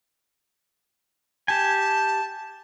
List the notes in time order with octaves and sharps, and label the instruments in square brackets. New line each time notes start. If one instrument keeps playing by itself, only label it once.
[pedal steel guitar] G4 G#5 [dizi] A5